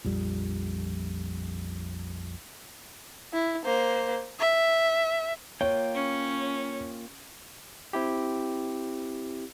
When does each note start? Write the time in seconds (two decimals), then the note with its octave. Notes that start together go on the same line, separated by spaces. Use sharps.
0.04 A#1 F2 G3
3.33 E4
3.65 A#3 C5
4.40 E5
5.61 A#3 F4 C#5 G5
5.94 C#4
7.93 C4 E4 G4